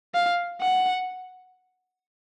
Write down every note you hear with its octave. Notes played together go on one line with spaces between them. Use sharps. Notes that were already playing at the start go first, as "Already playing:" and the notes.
F5
F#5